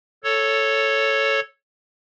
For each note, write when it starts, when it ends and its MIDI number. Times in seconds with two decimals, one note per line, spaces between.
0.24 1.40 69
0.24 1.40 73